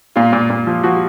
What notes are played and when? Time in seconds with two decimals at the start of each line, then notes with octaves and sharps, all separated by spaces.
0.16 A#2 F4
0.33 A#2
0.50 A#2
0.67 F3
0.83 F3 F#4